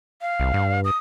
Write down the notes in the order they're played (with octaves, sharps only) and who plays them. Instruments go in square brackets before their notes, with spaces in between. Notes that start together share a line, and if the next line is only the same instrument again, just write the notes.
[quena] F5
[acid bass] C2
G2
[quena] D#6